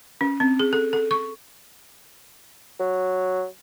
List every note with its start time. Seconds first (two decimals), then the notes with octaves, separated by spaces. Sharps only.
0.21 C#4
0.40 C4
0.60 G#4
0.73 A4
0.93 A4
1.11 C#6
2.79 F#3